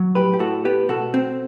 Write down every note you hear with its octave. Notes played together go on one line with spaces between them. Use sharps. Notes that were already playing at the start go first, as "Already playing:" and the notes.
Already playing: F#3
A2 G4 B4
G4
A2 F#4 A4
B3 G4 B4
B2 F#4 A4
C4